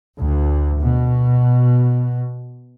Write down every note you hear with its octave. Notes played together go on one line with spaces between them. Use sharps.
D2
B2